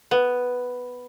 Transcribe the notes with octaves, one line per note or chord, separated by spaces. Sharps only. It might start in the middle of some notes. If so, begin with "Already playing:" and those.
B3